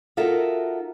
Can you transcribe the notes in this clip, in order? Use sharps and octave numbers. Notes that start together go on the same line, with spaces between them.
D#4 F4 F#4 A4 A#4 E5